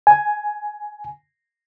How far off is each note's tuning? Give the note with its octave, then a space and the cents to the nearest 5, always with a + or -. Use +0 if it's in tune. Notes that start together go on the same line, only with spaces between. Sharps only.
G#5 +5